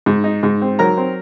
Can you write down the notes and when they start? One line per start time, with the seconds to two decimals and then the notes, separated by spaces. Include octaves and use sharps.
0.06 G#2
0.24 D#4
0.43 G#2
0.62 C4
0.79 F#3 A#4 A#5
0.97 C4